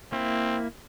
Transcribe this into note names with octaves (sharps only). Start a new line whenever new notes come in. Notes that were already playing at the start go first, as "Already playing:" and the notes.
A#3 C4 E4